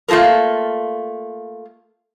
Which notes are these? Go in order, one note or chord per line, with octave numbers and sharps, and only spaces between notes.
A3 A#3 F4 A4 A#4